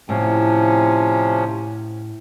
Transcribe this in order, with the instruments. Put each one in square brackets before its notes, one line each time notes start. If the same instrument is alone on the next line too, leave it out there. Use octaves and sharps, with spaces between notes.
[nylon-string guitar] A2 [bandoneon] C3 F3 C#4